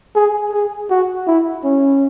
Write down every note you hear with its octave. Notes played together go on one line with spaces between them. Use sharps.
G#4
G#4
F#4
E4
C#4